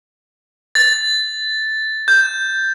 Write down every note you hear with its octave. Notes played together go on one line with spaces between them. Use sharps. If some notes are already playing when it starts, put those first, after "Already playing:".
A6
G6